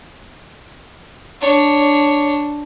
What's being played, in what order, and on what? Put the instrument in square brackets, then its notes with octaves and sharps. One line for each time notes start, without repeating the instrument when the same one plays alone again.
[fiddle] D4 C#5